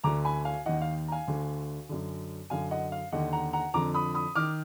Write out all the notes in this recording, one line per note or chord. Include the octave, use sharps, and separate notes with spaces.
D2 D3 A#5 D6
G#5 B5
F5 G#5
D#2 D#3 D#5 F#5
F5
A#5
F5 G#5
D2 D3
F#2 D3
F#2 D3 F5 G#5
D#5 F#5
F5
D#2 D3 D#5 F#5
F#5 A#5
F#5 A#5
F2 D3 A#5 D6
B5 D#6
B5 D#6
D#3 D6 F6